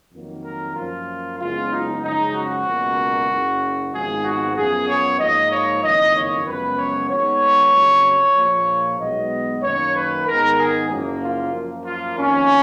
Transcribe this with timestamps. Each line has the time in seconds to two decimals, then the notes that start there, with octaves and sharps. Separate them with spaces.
0.12 F2 D#3 F#3 A#3
0.44 A#4
0.76 F#2 F3 A#3 F4
1.39 F#1 F#2 C#3 G#3 B3 F4
1.71 D#4
2.02 F#2 C#3 F3 G#3 D#4
2.34 F#4
2.66 C#2 B2 A#3
3.29 F#1 F#2 C#3
3.92 G#1 G#2 F3 B3 G#4
4.25 F#4
4.56 F#2 F3 B3 G#4
4.88 C#5
5.19 G#2 F3 A#3 D#5
5.51 C#5
5.82 F#1 F2 D#3 A#3 D#5
6.15 C#5
6.45 F#2 C#3 F3 G#3 B3 B4
6.77 C#5
7.09 D#2 D#3 G#3 B3 C#5
7.73 F2 C#3 F#3 A#3
8.36 A#1 A#2 F3 A#3
8.99 B1 B2 G#3 B3 D#5
9.62 F#2 D#3 A#3 C#5
9.95 B4
10.26 G#2 D#3 G#3 B3 A#4
10.57 G#4
10.89 F#1 F#2 C#3 F3 A#3
11.21 F4
11.53 F#2 F3 A#3
11.85 F4
12.16 F2 D#3 A#3 C#4